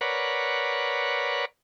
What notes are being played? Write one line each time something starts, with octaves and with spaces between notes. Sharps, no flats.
A#4 B4 C#5 D5 F#5